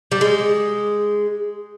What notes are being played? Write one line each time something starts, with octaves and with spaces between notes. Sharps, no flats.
G3
G#3